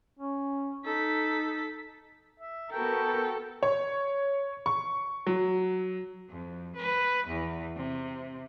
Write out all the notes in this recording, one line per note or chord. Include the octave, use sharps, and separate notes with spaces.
C#4
D#4 A4 B6
E5
B3 F#4 A4 A#4 G5
C#5
C#6
F#3
F2
B4
E2
C3